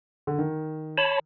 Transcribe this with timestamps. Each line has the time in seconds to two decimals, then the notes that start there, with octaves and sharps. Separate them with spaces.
0.27 D3
0.39 D#3
0.98 C#5 A5 B5